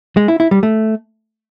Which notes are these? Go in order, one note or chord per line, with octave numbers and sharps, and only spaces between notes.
G#3
E4
E4
G3
A3